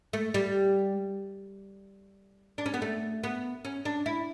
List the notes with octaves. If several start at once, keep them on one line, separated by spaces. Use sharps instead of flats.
A3
G3
D4
C#4
B3
A3
B3
C#4
D4
E4